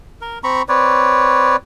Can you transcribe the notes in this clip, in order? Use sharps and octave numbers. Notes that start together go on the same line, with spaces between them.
A#4
C4 A#5 B5 C#6
C4 B4 C#5 D5